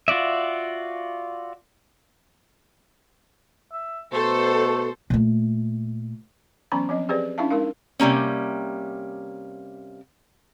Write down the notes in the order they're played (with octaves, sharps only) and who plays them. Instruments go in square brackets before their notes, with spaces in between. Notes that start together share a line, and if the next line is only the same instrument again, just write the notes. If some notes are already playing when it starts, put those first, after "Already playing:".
[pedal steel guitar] F4 F#4 D5 E5
[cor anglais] E5
[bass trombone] B2 [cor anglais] A3 [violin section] A4 C5
[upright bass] A#2 A3
[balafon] E3 F#3 B3 C#4 A#5 B5
F3 C4 D#5
C4 G4 G#4 B4 C5 D5
C#4 D4 E4 E5 F5 A5
G#3 D#4 A#4 F5
[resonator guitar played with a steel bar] C3 G3 A#3 C#4